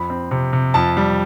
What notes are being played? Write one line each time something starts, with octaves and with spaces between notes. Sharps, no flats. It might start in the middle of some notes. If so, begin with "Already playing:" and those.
Already playing: F2 B5
C4
C3
C3
F2 A5
G3